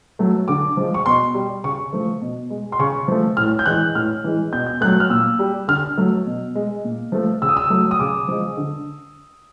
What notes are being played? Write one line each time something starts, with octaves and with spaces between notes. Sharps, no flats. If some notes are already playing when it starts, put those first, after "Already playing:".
F#3 A3
D3 D6
F3 G#3
C#6
B2 C6
G3
C#3 C#6
F3 A3
B2
G#3
C6
C#3 C#6
F3 A3
A2 F6
G6
E3 G#3 F#6
A2 F6
E3 G#3
B2 G6
G6
F#3 A3 F#6
F6
A#2 E6
G3
D3 F6
F#3 A3
B2
G#3
A#2
F3 A3
C#3 E6
D#6
E6
F#3 A3
D#6
C#3 D6
F3 G#3
D3